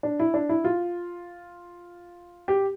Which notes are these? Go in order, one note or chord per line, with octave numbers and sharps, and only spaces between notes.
D4
E4
D4
E4
F4
G4